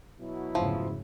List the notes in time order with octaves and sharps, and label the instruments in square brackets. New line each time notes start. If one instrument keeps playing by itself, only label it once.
[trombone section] B2 F#3 E4
[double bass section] F1 G#2 C#3 [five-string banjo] F3